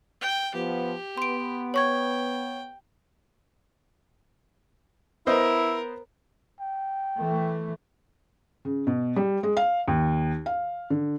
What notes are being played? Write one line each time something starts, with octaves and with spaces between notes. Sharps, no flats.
G5
F3 B3 G4
B3 C6 D7
C#5 G5 C#6 G#6
B3 E4 A#4 C5 D#5
G5
E3 A3
C#3
B2
G3
G#3
F5
D#2
F5
D3